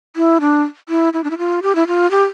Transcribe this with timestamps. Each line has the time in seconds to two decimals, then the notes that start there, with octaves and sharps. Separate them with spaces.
0.16 E4
0.41 D4
0.89 E4
1.13 E4
1.24 D4
1.31 E4
1.38 F4
1.63 G4
1.75 E4
1.87 F4
2.11 G4